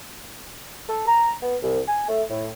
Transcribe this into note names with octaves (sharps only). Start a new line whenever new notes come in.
A4
A#5
B3
C2
G#5
A3
A2